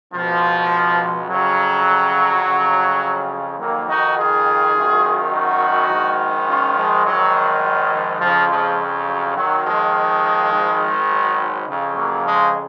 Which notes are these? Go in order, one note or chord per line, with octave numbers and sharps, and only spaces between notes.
C#2 B2 F3
F2 C#3 F#3
F2 C#3
F2 D#3 F#3 A#3
D#4 F#4
F4 G#4
G#1 F#2 D#3
D#4 F#4
A#1 G#2 D#3
C#4 F4
F3 G#3
A#1 G#2 D#3 F#3
F#3
F3
F2 C#3 F3
F3 G#3
F#3
D#2 D#3 F#3
F3 G#3
G#1 G#2 D#3
F#3
F2 C#3
F#3 A#3
F3 G#3